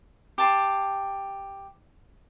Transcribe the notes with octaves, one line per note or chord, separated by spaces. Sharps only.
G4 A5 C6